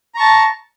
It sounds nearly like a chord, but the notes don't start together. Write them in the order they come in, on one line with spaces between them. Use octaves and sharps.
A#5 C#6 A5